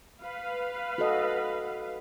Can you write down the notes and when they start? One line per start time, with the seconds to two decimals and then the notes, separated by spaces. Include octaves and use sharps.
0.24 B4 F5
0.98 F#4 A4 D#5